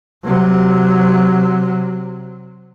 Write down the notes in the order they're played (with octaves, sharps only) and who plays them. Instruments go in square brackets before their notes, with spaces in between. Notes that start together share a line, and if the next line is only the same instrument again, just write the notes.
[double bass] C3 F#3